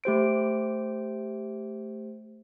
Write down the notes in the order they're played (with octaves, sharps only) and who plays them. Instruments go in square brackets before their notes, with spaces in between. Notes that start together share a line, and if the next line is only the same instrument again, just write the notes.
[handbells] A3 G4 C5 D7